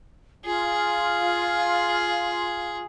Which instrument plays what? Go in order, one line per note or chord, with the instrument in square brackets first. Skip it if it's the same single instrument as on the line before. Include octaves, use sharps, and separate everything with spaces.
[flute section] F4 [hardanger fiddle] G#4